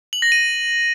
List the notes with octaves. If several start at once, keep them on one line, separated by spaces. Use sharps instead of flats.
F#7
A#6
D#7